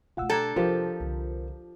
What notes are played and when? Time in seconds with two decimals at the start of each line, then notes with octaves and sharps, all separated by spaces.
0.17 B2 A3 F4 F#5 E6
0.30 D4 A4 G5 A5 A#5 G#6
0.56 C2 F3 G3 F4 G4 A#4 C5
1.00 C2 D3